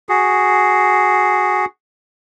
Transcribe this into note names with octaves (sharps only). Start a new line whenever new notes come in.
F#4 G#4